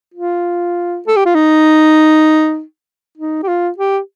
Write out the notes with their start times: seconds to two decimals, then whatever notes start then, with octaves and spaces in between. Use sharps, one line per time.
0.14 F4
1.07 A4
1.17 G4
1.26 F4
1.35 D#4
3.18 D#4
3.43 G4
3.48 F4
3.78 G4